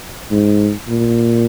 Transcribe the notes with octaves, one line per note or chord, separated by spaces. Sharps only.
G#2
A#2